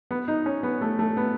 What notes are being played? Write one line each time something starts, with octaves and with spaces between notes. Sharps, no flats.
B3
D#4
C#4
B3
A3
A3
B3